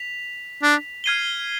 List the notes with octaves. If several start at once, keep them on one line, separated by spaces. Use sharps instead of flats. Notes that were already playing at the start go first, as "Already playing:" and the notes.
Already playing: B6 F7
D4
F6 G#6 C7 D#7 G7